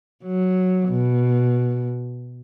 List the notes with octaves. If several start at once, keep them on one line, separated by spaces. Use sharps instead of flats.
F#3
B2